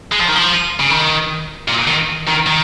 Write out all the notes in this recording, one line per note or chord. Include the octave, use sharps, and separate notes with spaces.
G#3
F3
D#3
F3
C#3
D#3
A#2
D#3
D#3
D#3